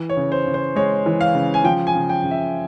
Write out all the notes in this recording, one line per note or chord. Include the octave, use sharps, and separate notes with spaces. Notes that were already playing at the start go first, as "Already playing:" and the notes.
Already playing: E3
C#5
C#3
C5
C#3
C5
G#3 C#5
E3
F5
C#3
G#5
F3 G5
G#5
C#3
G5
C#3
E5